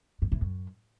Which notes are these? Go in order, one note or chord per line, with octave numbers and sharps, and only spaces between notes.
G2
A2
F#2